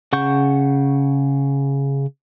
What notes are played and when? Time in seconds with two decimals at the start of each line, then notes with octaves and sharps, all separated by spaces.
0.13 C#3 F#5 C#6 G6